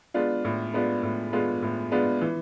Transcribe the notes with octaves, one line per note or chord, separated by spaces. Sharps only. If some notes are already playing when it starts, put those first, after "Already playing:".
G#3 B3 D4 F4
A2
G#3 B3 D4 F4
A2
G#3 B3 D4 F4
A2
G#3 B3 D4 F4
E3